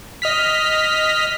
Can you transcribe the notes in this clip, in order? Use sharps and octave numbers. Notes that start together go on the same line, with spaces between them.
D#5 F6 B6